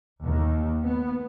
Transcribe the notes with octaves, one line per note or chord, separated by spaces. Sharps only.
D#2
B3